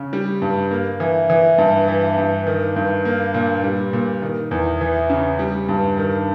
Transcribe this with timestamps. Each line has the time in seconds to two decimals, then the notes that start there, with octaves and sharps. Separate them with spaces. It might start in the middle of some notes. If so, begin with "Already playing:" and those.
Already playing: C#3
0.13 G3
0.42 G2
0.71 A#3
1.00 E3
1.30 E3
1.58 G2
1.88 E3
2.18 G2
2.47 D#3
2.76 G2
3.05 A#3
3.34 A#2
3.64 G3
3.93 A#2
4.22 D#3
4.51 E2
4.81 E3
5.10 C#3
5.39 G3
5.69 G2
5.98 D#3